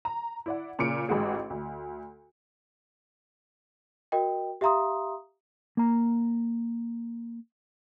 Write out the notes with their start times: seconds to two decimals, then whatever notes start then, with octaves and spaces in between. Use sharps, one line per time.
0.05 A#5
0.46 E4 D5 F#5
0.79 A#2 C#3 D6 C#7 D7
1.09 A1 G#2 F#4 G#4
1.50 D2
4.12 F#4 A#4 D#5 G5
4.61 G4 E5 F5 A#5 C6 D#6
5.77 A#3 A#5